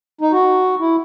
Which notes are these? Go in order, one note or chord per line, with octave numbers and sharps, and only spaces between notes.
D#4
F#4
E4